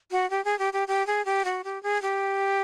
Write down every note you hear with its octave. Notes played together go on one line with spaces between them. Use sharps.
F#4
G4
G#4
G4
G4
G4
G#4
G4
F#4
G4
G#4
G4